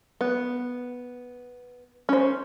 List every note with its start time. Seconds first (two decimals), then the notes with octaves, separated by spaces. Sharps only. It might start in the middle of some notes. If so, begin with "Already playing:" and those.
0.21 B3
2.09 C#4 C5